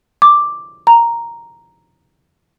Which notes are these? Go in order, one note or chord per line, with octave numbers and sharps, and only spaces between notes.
D6
A#5